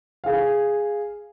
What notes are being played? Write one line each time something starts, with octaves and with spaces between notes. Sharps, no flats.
G#4 F5